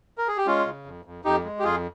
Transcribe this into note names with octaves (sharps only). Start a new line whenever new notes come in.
A#4
G#4
G4
G#3 C#4 F4
C#3
F2
F2
F2 D#4 G4
G#3
G4
F2 F4 G#4